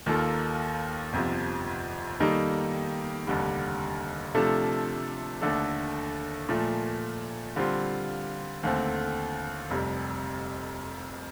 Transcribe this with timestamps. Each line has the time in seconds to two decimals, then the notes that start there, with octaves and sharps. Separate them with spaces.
0.06 D#2 D#3 A#3 F4 A4
1.13 G1 F2 C3 F3
2.20 D#3 G3 A#3 D#4 A4
3.27 F1 D#2 D3 G3
4.35 C3 F3 A3 D4 A4
5.42 D#2 D3 A3 D4 A4
6.49 A#2 F3 A3
7.56 D3 G3 C4 F4
8.63 D#2 D3 A3 C4
9.70 F1 F2 C3 G3